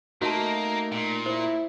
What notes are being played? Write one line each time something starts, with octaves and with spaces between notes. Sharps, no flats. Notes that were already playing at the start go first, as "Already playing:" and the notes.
A3 A#3 D#4 F#4 A#4 A5
A#2 D#5
E4 C5